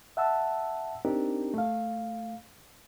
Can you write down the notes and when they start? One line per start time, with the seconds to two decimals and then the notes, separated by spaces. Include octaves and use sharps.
0.17 E5 F#5 A5 E6
1.05 C4 D4 D#4 G4 A#4
1.54 A3 F5